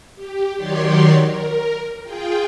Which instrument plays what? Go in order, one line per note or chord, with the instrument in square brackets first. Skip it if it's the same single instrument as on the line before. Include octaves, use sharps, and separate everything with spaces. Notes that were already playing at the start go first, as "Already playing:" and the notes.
[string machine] G4
D#3 F#3 G4 C#5 D5 C6
A#4
F4 G#4 G5